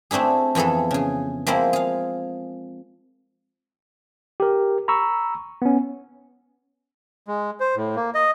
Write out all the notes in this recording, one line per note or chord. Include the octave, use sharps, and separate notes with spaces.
A3 C4 D4 E4 G#4
F2 E3 B3 G#4 A4
C#3 G#4
F3 G#3 A#3 C4 E4
G#4 F5
G4 A#4
A#5 B5 C#6 E6
B3 C#4
G#3
C5
A2
A#3
D#5